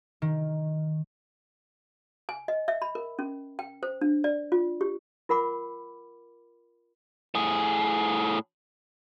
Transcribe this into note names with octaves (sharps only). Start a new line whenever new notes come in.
D#3
G#5
D#5
E5
B5
A#4
C#4
G5
C5
D4
D5
F4
G4
F4 A#4 F#5 B5 D6
A2 G#4